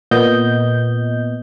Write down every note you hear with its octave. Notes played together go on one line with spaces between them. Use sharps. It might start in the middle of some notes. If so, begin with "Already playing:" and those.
A#2 B3 D#5 G6